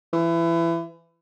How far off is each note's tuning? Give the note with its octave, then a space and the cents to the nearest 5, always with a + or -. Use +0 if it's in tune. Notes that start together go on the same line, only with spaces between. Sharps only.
E3 +25